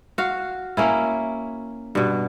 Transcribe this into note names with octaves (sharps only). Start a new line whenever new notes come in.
F#4 F5
A#3 C#4 E4
G2 B2